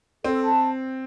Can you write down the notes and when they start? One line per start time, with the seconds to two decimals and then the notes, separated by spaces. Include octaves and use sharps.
0.24 C4 A4
0.44 A5